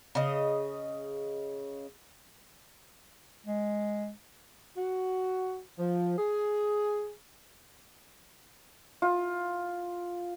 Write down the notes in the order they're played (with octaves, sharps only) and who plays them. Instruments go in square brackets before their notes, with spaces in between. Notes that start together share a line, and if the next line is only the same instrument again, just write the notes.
[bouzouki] C#3 D#5
[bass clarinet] G#3
[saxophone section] F#4
F3
G#4
[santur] F4